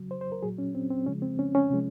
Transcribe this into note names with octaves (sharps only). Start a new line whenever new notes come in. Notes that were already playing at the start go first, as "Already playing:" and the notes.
Already playing: C#3 F#3
C5
C5
A#4
A#2 F#3 G#4
C#4
C4
C4
C#3 F3 G#3 C#4
C4
C#4
C#4
C3 F3 G#3